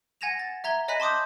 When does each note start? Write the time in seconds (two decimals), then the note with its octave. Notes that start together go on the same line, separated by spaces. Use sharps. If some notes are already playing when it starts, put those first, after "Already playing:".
0.21 F#5 G#5 G#6 A#6 E7 F7
0.39 A6
0.64 E5 A#5 G#6 G7
0.88 C#5 D#5 G#5 B5 F#6 B6
1.00 A5 C6 D6 D#6 G6